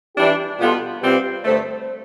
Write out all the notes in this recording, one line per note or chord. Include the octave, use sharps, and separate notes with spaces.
E3 G3 D4 E4 G4
B2 G3 B3 F4 A4
C3 G3 C4 F4 G4 B4
G2 D3 A3 A4 C5